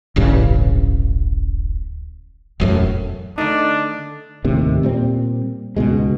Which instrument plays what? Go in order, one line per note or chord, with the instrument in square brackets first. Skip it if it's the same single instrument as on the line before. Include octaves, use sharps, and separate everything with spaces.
[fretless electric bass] D1 A1 G2 C#3
E1 F#2 A2
[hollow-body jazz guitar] D3 A3 D#4 [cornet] D4
[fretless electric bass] D#2 A2 C3 D#3
A#2 G3 C4
C#2 G#2 B2 G#3